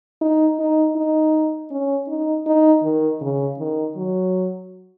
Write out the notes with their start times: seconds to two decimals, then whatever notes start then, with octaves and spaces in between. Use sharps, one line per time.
0.21 D#4
0.59 D#4
0.96 D#4
1.71 C#4
2.08 D#4
2.46 D#4
2.84 D#3
3.21 C#3
3.59 D#3
3.96 F#3